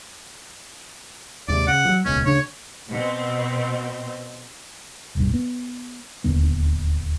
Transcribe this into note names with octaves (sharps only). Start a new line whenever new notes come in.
D#2 G#2 C3 D5
C#3 F#5
F3 F#3
D#1 C#2 B2 C#4
D2 C#3 D4 C#5
B2 C4
D#1 B1 G2
B3
D1 D#2 D3 B3